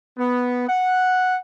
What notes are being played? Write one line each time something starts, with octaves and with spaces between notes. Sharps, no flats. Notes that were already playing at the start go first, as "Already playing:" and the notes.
B3
F#5